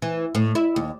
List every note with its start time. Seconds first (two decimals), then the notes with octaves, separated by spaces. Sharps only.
0.02 E3
0.35 A2
0.55 E4
0.76 D#2